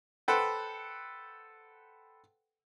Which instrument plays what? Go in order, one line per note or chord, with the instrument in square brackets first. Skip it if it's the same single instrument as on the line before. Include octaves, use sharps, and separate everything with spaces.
[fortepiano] A4 B4 C5 F#5 G5